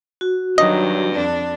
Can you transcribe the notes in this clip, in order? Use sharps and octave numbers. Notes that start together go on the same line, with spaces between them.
F#4
G2 D#3 F#3 D#5
F2 D4